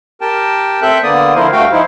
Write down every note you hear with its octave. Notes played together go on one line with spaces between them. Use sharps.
G4 A#4 G5 A5
C4 A4 E5 G5 F#6 G6
D3 A#3 B3 D5 D#6
D3 F3 E4 A#4 C5
G2 A3 F#4 F5 G5
F3 D#4 E4 C5